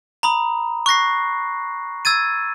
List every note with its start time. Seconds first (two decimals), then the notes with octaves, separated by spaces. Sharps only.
0.23 A#5 B5 D#6
0.86 C#6 F#6 A#6 C7
2.05 E6 G#6 A6 D#7